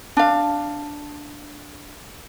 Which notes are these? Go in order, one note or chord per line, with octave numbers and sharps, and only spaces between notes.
D4 F5